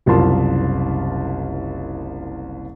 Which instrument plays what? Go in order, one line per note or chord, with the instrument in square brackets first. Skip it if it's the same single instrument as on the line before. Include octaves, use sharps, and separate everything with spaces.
[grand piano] F#1 C2 F4 A#4 A5 C6